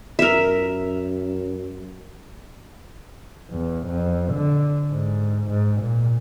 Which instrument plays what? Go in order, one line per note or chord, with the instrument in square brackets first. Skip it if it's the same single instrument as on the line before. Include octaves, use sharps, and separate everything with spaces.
[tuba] F#2 [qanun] A#4 E5
[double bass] E2
F2
D3
G#2
G#2
A#2